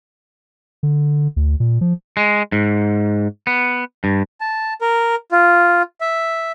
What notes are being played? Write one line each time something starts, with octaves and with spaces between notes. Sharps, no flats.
D3
D2
A#2
F3
G#3
G#2
B3
G2
A5
A#4
F4
E5